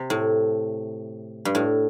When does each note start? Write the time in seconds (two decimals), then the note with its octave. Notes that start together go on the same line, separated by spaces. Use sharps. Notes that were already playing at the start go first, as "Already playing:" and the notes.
Already playing: C3
0.10 A2
1.45 G2
1.55 A2